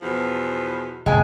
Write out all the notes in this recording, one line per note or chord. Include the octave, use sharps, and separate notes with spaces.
E2 B2 F3
F#1 C#2 A2 G#3 G5 G#5